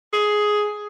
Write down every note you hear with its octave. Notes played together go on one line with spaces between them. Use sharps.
G#4